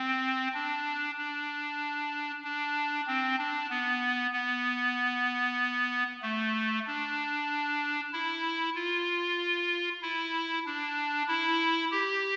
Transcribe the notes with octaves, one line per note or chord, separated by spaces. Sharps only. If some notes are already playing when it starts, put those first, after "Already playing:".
Already playing: C4
D4
D4
D4
C4
D4
B3
B3
A3
D4
E4
F4
E4
D4
E4
G4